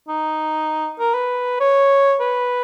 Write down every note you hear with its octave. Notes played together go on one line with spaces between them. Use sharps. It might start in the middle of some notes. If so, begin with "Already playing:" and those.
D#4
A#4
B4
C#5
B4